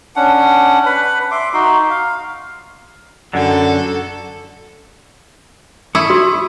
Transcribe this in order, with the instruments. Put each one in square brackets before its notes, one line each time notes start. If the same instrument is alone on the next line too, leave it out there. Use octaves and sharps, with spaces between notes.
[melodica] C#4 D4 F#5
B4 B5
E5 C6 D6
D#4 F#4 C6
F5
[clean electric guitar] F#2 D3 [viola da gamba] F#4 A4
[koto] E4 [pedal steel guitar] C#6 D#6
[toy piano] F#4